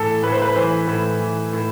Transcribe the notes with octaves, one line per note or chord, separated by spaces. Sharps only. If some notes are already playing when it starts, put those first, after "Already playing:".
Already playing: A2 E3 A4
A2 B4
C5
B4
E3 C5
A2
E3
A2